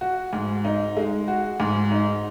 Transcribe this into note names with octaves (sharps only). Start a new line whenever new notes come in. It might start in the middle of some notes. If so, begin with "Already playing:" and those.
F#4
G#2
D#4
G#3
F#4
G#2
D#4